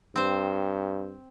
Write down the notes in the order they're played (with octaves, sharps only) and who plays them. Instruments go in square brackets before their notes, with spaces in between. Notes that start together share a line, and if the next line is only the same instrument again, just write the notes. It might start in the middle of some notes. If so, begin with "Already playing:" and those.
[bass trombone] G2 [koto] C4 C5